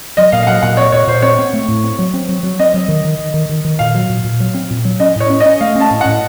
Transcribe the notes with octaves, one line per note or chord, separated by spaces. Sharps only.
F#3 D#5
A#2 F5
F5
F#3 F#5
A#2 F#5
C4 C#5
A#2 C#5
A#2 C5
C4 C#5
C4
A3
A2
C4
F#3
C4
F#3
F#3
C4 D#5
F#3
D#3
D#3
D#3
D#3
D#3
D#3
A#2 F5
F#3
A#2
A#2
F#3
C4
A#2
F#3
C#4 D#5
A2 C#5
C#4
D#5
C#4
A3 F5
C#4
A5
A2
A2 F#5